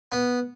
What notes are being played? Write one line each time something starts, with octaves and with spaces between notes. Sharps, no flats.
B3